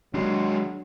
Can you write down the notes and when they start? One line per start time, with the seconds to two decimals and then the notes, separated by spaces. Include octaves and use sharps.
0.14 D#2 F#3 G#3 D4